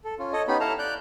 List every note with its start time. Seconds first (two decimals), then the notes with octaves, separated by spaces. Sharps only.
0.04 A4
0.19 C#4 F4
0.33 A4 C#5 D#5
0.48 B3 C#4 D#4 G4 B5
0.60 E4 A4 F5 A5 A#5
0.79 D5 F#6 G6